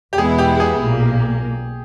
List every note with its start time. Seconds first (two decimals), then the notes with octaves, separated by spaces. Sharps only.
0.13 G4
0.17 E2 B2 G#3 B3 E4 G#4
0.38 G4
0.60 G#4
0.81 B1 A#2 A#3